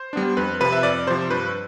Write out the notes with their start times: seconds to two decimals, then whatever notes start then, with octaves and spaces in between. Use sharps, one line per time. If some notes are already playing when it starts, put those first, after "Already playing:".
Already playing: C5
0.13 G3 B3 D4
0.37 F2 B4
0.60 C3 F3 B4
0.72 E5
0.83 F2 D5
1.07 C3 F3 C5
1.30 G2 B4